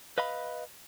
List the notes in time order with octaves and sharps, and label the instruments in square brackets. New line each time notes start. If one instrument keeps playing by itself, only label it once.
[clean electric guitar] B4 D#5 F5 B5